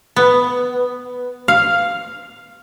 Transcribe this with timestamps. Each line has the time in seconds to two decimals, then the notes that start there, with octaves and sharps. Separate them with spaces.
0.16 B3
1.48 F5